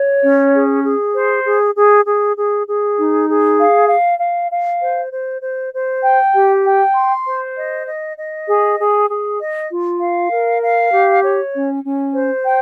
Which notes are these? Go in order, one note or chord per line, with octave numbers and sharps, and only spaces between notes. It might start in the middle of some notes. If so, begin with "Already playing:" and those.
Already playing: C#5
C#4
G#4
G#4
C5
G#4
G#4
G#4
G#4
G#4
D#4
G#4
F5
F5
F5
F5
C5
C5
C5
C5
G5
G4
G5
C6
C5
D#5
D#5
D#5
G#4
G#4
G#4
D#5
F4
F5
A#4
F5
G4
C#5
C#4
C#4
C5
G5